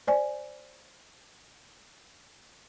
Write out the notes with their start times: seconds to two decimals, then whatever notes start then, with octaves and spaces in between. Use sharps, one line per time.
0.07 C5 D5 G#5